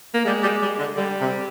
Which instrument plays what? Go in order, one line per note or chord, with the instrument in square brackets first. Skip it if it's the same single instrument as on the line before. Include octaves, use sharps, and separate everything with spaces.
[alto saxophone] A#3
[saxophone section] G3 [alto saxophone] G#3
[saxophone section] G3
G3
D3
[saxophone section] D3 [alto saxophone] G3
[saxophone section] C3